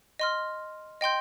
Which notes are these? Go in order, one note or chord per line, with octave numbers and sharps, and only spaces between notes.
D#5 C6 F6
D#5 G5 C6 G6